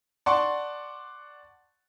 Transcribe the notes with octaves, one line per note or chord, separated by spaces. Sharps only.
D5 F#5 A5 C6 C#6